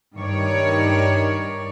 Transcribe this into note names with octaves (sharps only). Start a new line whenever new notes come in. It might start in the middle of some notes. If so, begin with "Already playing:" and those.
G2 D#3 C#5 D5